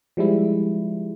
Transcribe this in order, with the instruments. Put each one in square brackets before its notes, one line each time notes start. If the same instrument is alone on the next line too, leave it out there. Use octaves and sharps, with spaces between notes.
[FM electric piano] F3 G3 G#3 E4